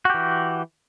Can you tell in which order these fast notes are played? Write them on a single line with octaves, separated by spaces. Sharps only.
F#4 G4 E3